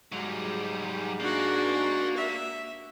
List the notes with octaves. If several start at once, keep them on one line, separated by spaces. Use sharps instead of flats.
G#2 F#3 G3
A#3 D4 F#4
E5